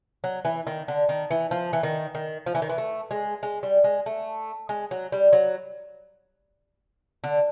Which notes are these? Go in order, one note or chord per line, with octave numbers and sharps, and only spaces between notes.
F#3
E3
D#3
D3
D#3
E3
F3
E3
D#3
D#3
F3
E3
D#3
E3
A3
G#3
G#3
G3
G#3
A3
G#3
F#3
G3
F#3
D3